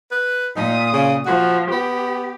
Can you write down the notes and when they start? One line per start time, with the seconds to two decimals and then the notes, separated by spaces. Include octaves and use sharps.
0.12 B4
0.56 A#2 D#4 D#6
0.94 C#3
1.26 F3 F#4
1.72 B3 G4